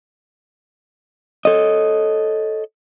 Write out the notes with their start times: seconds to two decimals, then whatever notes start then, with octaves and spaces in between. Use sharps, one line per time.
1.45 A4 C#5 D#5